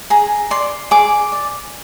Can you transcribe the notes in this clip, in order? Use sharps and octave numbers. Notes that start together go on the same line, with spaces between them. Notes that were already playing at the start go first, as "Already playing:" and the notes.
G#4 A#5
D5 C6
G#4 D6
D5